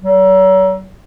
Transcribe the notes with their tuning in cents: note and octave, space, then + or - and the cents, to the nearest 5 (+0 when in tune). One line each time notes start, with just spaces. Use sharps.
F#3 +40